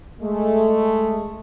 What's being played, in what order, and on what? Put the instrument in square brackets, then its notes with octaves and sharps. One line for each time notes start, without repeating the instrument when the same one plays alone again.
[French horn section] G#3 A3